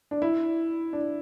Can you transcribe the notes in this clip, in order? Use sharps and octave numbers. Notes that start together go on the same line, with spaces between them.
D4
E4
D4